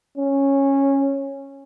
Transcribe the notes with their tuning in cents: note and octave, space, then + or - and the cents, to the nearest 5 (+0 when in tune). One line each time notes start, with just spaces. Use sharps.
C#4 -10